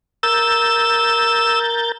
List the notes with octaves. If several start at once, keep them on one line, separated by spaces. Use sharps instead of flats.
A#4 E6 G6 A6